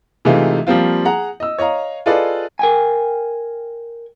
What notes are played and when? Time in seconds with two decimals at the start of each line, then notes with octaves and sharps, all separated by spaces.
0.25 C3 E3 G#3 A3 D#4 F4
0.67 F3 G3 A#3 C4 F4
1.05 G#4 F#5 A#5
1.40 D#5 E6
1.58 C#5 D#5 F5 A#5
2.06 F4 G#4 A4 B4 D5 D#5
2.59 A#4 G5 G#5